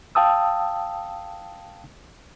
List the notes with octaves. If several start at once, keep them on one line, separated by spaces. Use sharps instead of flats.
F5 G5 A5 D#6 E6